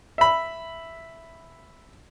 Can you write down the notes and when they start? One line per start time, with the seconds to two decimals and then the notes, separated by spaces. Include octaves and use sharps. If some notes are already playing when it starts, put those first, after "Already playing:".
0.18 E5 B5